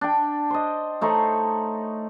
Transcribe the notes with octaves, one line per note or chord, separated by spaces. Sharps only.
D4 G5
C5 D#5
A3 D#4 C5 C#5